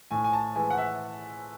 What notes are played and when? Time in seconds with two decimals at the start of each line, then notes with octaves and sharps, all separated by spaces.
0.11 A2 G#5
0.24 G#5
0.33 A5
0.56 E3 G#3 G#5
0.70 F#5
0.78 E5